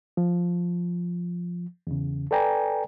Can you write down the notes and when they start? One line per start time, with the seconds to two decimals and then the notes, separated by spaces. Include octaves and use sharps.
0.17 F3
1.87 E2 C#3
2.31 A4 B4 D5 G5 G#5 A#5